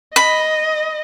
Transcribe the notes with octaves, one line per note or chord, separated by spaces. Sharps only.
D#5 B5